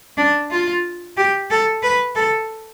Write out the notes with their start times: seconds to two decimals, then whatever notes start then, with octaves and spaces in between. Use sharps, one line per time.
0.17 D4
0.51 F4
1.17 G4
1.50 A4
1.83 B4
2.16 A4